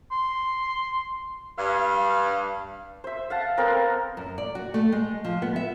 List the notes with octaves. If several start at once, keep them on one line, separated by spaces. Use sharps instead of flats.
C6
G2 F5
C5 E5
F5 F#5 A5
B3 C4 A4 A#4
F#2
D5
F#4
A3
G#3
F3
B3
E5